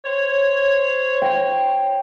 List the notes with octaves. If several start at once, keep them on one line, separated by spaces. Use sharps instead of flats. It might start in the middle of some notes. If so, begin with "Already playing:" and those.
C5 C#5
G5